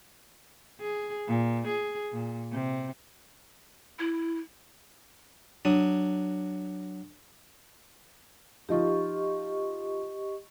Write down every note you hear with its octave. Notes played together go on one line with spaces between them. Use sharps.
G#4
A#2
G#4
A#2
C3
E4
F#3 D4 D#6
F3 D#4 F4 G4 D#5 C#6